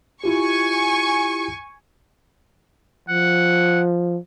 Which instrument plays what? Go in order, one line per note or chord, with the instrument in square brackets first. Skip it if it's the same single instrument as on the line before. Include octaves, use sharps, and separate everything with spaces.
[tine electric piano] E4 F4 G4 [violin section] G#5 C#6
[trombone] F3 [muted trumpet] F#5